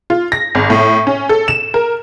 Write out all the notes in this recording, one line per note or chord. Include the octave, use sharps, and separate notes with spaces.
F4
A#6
G#1
A2
C#4
A4
E7
A#4